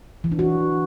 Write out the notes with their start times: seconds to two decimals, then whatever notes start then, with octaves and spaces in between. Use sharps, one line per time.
0.24 E3
0.31 D4
0.39 F#4